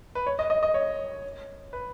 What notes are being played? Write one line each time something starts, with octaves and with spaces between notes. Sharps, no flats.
B4
C#5
D#5
D#5
D#5
C#5
B4